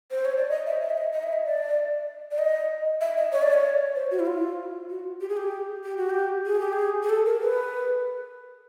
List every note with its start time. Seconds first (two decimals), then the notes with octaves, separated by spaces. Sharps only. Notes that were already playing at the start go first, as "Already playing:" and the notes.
0.11 C5
0.25 C#5
0.37 D5
0.50 D#5
0.66 E5
0.81 D#5
0.90 E5
0.98 D#5
1.13 D#5
1.23 E5
1.33 D#5
1.45 D5
2.31 D5
2.39 D#5
3.01 E5
3.17 D#5
3.32 C#5
3.43 D5
3.53 C#5
3.95 C5
4.11 F#4
4.19 E4
4.27 F4
4.90 F#4
5.21 G4
5.29 G#4
5.37 G4
5.84 G4
5.97 F#4
6.10 G4
6.46 G#4
6.60 G4
6.73 G#4
7.03 G#4
7.10 A4
7.26 A#4
7.42 B4